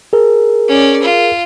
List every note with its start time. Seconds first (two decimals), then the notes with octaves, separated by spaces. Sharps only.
0.13 G#4 A#4
0.69 C#4 D5
1.02 F4